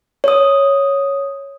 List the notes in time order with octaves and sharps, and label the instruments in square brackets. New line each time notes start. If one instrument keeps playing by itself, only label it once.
[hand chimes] C#5 D#6